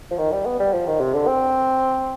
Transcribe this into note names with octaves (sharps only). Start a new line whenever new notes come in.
F3
D#3
G3
B3
G3
F3
D#3
C3
D3
C4